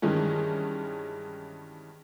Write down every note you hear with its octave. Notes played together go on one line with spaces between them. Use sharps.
G2 D#3 E3 G#3 C#4